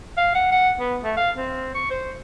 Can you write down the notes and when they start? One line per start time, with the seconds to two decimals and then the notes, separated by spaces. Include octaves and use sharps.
0.17 F5
0.35 F#5
0.51 F#5
0.80 B3
1.03 A3
1.17 F5
1.36 C4
1.74 C#6
1.90 C5